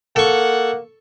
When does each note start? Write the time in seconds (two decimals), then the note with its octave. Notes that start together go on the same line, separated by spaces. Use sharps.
0.16 A#3 A4 F#5 C#6